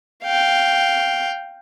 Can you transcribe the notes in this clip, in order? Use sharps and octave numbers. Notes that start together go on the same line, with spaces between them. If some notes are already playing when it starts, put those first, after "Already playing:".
F5 G5